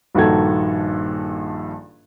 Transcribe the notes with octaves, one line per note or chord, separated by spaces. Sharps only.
A#1 G2 D#3 F#4 A4 G#6